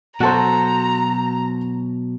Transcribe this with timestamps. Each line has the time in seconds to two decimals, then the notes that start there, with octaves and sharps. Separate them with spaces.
0.21 B2 F#3 F#4 A4 C5 A#5